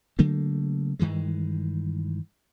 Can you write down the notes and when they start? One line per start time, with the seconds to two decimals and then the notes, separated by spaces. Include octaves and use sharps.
0.19 C#3 F#3 A3 A#3
0.99 G2 D#3 E3 G#3